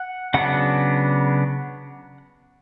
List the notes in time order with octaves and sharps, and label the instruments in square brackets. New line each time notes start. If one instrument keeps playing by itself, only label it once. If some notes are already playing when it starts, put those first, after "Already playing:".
Already playing: [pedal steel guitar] F#5
C#3 F#3 B3 D4 F#5